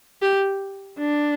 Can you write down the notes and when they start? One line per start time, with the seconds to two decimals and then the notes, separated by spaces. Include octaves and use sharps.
0.22 G4
0.98 D4